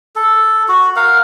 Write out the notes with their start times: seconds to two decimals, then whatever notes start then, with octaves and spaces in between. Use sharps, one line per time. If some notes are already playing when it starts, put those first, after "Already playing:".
0.16 A4
0.68 F#4
0.96 A#4 F5 F#5